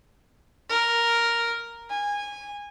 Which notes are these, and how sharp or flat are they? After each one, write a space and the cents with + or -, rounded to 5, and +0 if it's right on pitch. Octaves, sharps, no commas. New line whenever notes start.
A#4 +0
G#5 -20